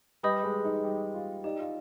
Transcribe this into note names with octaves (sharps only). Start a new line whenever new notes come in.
G3 B4 D#5 B5 D#6 G6
G#3
D#4
G3
F4
D#4 G4 D5 G5
F4